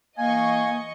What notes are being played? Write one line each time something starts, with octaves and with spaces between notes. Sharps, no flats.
E3 A#3 D#5 F5 G#5 C#6